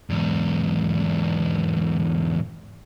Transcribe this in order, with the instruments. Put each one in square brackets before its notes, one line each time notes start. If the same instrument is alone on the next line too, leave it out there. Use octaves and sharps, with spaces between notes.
[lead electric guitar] E2 G#2